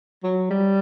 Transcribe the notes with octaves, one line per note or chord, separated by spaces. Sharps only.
F#3
G3